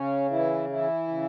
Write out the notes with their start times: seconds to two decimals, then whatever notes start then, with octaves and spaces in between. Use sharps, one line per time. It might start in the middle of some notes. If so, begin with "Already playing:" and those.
Already playing: C#3 C#4
0.31 E3 E4
0.69 E3 E4
1.08 C#3